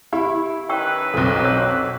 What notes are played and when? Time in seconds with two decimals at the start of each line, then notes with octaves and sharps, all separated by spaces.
0.13 E4 G4 B5 C#6
0.69 D#3 C#4 B4 G5 C#6 E6
1.14 B1 F2 A4
1.44 C#5 E6